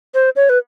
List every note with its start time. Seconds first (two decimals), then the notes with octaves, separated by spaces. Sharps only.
0.14 C5
0.36 C#5
0.49 B4